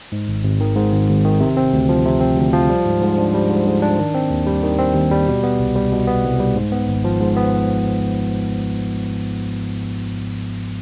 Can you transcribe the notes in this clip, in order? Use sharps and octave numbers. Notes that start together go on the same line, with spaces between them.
G#2
G#1
G#1
D#3
G#2
G#1
G#1
D#3
C3
C4
D2
F3
C3
C4
D2
F3
G3
G#2
G#2
D4
G3
G#2
G#2
D4
D#3
C4
D#2
G3
D#3
C4
D#2
G3
B2
B3
C2
G3
B2
B3
C2
G3
G#2
B3
G#1
F3
G#2
B3